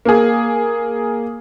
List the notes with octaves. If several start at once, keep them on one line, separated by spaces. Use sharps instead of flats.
A#3 G#4